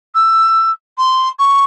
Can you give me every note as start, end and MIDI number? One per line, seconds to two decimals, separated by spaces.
0.15 0.70 88
0.98 1.28 84
1.39 1.65 85